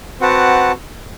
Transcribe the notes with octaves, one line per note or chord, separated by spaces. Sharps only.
C4 F#4 B4 F#5 A5